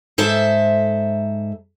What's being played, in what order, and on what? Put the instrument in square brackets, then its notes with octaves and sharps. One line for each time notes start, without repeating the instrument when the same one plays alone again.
[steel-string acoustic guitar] G#2 A4 C5 E5